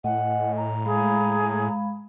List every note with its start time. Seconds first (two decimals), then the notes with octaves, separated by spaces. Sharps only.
0.04 A2 D#5 F#5 G#5
0.57 A#5
0.85 G#3 G#4 F5 B5